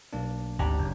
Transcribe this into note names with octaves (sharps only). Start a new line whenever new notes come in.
B1 A#3 D4
G#1 D2 D4 G4 A#5
F#1